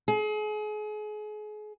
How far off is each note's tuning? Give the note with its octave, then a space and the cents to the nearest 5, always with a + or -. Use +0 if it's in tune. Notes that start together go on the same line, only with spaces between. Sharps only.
G#4 +35